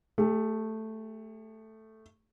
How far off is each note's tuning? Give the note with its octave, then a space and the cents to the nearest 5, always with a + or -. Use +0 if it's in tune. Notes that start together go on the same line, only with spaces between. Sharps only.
A3 +0 G4 +45